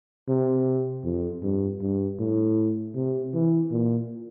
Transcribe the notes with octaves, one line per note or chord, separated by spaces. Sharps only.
C3
F2
G2
G2
A2
C3
E3
A#2